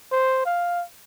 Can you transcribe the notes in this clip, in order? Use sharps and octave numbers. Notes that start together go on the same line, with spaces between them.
C5
F5